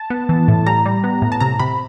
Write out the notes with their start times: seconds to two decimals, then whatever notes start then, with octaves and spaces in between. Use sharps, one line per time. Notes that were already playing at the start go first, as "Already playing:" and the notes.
Already playing: A5
0.10 B3
0.29 E3
0.48 A2
0.66 G3 A#5
0.86 G3
1.04 B3
1.22 A2
1.32 A5
1.40 C3 A#5
1.59 C3 B5